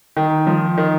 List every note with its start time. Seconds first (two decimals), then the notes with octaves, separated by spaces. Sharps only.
0.17 D#3
0.47 F3
0.78 D#3